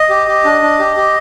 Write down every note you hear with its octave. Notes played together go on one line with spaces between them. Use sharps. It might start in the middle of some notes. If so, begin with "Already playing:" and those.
Already playing: D#5
G4
G4
D4
D4
G4
G4